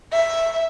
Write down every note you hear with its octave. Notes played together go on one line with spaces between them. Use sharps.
E5